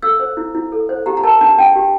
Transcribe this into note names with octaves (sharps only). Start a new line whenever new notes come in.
A4 E6
C5
E4
E4
A4
C5
G4 A#5
A#5
A#4 A5
D4 A5
D4 G5
G4